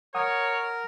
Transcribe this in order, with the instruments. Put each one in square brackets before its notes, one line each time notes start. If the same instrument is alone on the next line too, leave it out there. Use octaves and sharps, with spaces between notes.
[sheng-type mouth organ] A#4 [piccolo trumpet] C#5 [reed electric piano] F#5 D#6